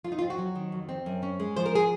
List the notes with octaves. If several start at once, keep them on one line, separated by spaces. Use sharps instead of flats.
F2 F4
D#4
F4
C4
F#4
F#3
D#3
F2
C4
F#2
C#4
G#3
F3 C5
A#4
G#4